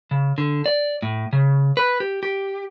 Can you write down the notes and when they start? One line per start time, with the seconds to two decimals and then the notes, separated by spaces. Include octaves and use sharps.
0.11 C#3
0.38 D3
0.66 D5
1.02 A2
1.33 C#3
1.77 B4
2.00 G4
2.23 G4